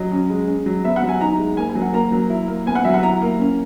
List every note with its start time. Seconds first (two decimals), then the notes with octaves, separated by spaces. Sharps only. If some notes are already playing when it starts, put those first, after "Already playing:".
Already playing: F#3 D#5
0.11 C#4
0.30 G#3
0.47 C#4
0.66 F#3
0.84 B3 E5
0.96 F#5
1.03 F#3
1.09 G#5
1.21 D#4 A#5
1.39 G#3
1.57 A#3 G#5
1.69 G#5
1.75 F#3
1.81 F#5
1.93 A#3 A#5
2.12 F#3
2.30 E4
2.48 A#3
2.66 B3 G#5
2.75 F#5
2.84 F#3 E5
2.94 F#5
3.03 E4 A#5
3.21 A#3
3.39 C#4